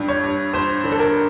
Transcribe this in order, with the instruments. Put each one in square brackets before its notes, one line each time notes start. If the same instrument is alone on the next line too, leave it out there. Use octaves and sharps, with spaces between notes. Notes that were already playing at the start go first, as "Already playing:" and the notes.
Already playing: [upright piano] G2 G3
C#5
G2
G2 C5
D3
A4
A#4